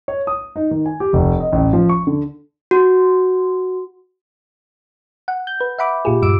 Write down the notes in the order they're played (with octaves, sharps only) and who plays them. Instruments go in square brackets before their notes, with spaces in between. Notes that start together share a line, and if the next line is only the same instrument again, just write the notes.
[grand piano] C#5
D#6
D#4
D#3
G#5
G4
F1
D#5
A1
F3
C#6
D3
[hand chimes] F#4
[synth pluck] F#5
G6
B4
E5 F#5 B5 D6
A#2 F4 G4 G#4
G2 D6 E6 D7